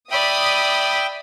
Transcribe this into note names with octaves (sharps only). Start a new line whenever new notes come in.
D5 E5 G5 B5 D#6